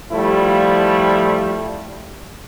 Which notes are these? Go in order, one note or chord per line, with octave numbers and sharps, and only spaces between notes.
F3 G3 A3 E4